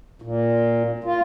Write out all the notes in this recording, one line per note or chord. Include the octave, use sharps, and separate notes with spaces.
A#2
F4